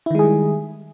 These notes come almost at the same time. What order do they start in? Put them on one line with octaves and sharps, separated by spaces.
E4 D#3 G#3 G#4 G3